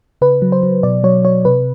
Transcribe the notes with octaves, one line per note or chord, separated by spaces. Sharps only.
C#3 B4
F#3
C5
F#3
B2 D5
F#3 C#5
F#3 C#5
C3 B4